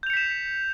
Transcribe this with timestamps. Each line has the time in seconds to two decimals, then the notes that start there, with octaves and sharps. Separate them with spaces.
0.03 G6
0.07 F7
0.10 C#7
0.13 B6
0.17 E7